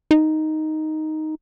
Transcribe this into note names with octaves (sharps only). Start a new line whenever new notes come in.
D#4